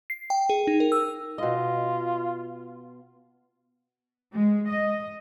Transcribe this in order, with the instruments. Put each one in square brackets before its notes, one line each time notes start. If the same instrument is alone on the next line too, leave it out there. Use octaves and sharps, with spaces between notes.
[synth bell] C7
G5
G#4
D#4
A#4
E6
[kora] B2 D#5 [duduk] F4
[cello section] G#3
D#5